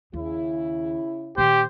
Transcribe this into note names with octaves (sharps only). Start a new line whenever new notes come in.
D#2 C#3 E4
A#2 D#3 G4 C5